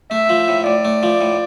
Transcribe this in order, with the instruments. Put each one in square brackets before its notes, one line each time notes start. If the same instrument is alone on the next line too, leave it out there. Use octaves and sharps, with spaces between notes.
[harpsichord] A3 [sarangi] E5
[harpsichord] F3
A2
[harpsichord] A2 [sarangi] D5
[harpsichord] A3
F3
A2